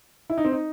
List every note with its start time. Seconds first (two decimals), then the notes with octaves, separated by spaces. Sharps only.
0.30 E4
0.38 D#4
0.45 C4
0.52 D#4